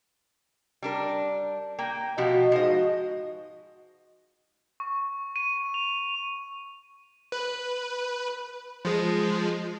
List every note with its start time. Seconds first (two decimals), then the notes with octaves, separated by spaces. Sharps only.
0.82 G3 D4 A#4
1.79 A#3 G5
2.18 B2 F3 F#4 G4 D#5
2.52 G#2 F3 D#5
4.80 C#6
5.36 D#7
5.74 F7
7.32 B4
8.85 F3 G#3